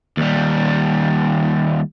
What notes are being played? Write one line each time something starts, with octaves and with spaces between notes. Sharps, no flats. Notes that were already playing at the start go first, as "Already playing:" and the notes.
D#2 G3